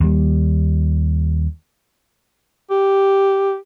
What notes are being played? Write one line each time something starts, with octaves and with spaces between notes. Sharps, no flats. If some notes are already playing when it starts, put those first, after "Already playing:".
D#2 G3
G4